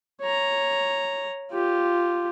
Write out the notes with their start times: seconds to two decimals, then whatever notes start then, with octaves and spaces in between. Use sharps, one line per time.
0.22 C#5 A#5
1.51 F4 G4